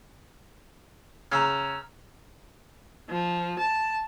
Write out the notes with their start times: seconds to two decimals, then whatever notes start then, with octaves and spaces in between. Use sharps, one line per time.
1.31 C#3 A#5 E6 F6
3.09 F3
3.60 A5